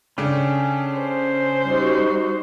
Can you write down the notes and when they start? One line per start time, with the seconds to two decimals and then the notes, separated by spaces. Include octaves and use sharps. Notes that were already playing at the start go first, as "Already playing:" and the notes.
0.18 C#3 C#4 D4 A4 G5
0.98 C5
1.68 G3 D#4 F#4